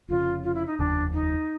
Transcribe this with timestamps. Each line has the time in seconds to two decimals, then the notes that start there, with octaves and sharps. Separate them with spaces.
0.08 F1 F2 C#3 F4
0.44 F4
0.55 E4
0.67 D#4
0.78 F1 D#2 C#3 F3 D4
1.13 D#4